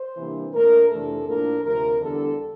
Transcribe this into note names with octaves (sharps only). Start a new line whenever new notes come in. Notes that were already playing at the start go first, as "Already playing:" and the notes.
Already playing: C5
C3 E3 G3 A#3 D4
A#2 A3 D4 A#4
F2 C3 E3 A3 D4 A4
A2 F3 A#3 D4 A#4
D2 C3 F3 A#4
E2 D3 G3 D4 A4